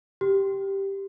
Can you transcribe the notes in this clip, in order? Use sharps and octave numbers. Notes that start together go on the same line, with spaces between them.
G4